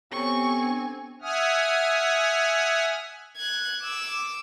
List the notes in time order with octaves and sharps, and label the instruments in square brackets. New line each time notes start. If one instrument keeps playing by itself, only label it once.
[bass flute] B3 [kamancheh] C4 G#5 [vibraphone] G4 A4 C#5 [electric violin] C#6
[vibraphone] D4
[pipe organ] E5 F#5 G#5 D#6 F6
[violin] F#6 G#6
D6 E6